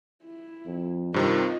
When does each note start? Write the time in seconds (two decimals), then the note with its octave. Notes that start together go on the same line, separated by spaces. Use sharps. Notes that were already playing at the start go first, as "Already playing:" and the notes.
0.24 E4
0.66 F2
1.14 G2 C3 D#3 C4 F4 D#5